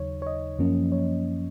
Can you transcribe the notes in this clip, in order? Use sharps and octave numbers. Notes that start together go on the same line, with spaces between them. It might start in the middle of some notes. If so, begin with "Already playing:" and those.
Already playing: D#2 C#3 F#3 D#4 C#5
C#5
D#5
F#2 F3 A#3 C#4
C#5